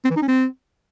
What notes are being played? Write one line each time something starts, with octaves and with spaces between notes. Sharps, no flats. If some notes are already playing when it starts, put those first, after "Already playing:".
C4
E3
D#4
C#4
C4